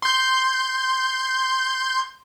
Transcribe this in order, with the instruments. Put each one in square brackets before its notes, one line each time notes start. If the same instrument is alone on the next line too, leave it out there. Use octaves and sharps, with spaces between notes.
[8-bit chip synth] C6 G6